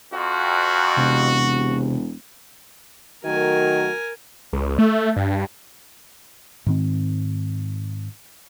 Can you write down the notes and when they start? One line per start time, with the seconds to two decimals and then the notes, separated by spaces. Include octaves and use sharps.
0.13 F2 F#4
0.97 E1 C3
3.24 D#3 F#3 A3 F#4 A#4 G#5
4.53 C#2
4.79 A3
5.17 G2
6.66 G#2 D#3 C4